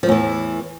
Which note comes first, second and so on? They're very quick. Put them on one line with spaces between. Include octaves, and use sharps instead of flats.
F3 A2 E2 E3